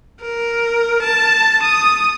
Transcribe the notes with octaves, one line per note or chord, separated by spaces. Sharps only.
A#4
A5
D#6